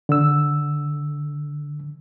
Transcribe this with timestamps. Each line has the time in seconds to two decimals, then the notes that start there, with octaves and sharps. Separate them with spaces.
0.09 D3 E6